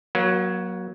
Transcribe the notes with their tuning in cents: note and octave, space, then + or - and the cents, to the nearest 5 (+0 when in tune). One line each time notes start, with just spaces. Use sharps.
F#3 +0 A#3 +35